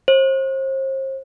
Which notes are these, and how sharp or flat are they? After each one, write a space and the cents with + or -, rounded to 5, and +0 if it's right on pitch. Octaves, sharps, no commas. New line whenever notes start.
C5 +35